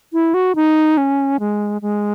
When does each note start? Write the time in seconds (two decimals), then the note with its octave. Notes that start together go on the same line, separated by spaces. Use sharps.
0.13 E4
0.34 F#4
0.55 D#4
0.97 C#4
1.40 G#3
1.82 G#3